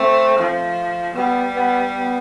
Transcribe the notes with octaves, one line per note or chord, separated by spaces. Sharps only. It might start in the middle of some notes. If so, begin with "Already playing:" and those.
Already playing: A3 C4
F3
G3 B3
B3
B3